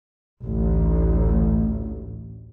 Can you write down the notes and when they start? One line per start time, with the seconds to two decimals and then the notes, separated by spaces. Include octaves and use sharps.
0.44 A1 D2